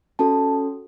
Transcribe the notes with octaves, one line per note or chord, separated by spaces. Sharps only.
C#4 F#4 A4 A5